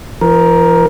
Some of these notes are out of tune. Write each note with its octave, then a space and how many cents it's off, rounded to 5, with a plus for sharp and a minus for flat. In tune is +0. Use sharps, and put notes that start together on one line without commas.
F3 -45 A#4 +10